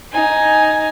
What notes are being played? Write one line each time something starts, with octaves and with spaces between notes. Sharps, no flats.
D#4 G#5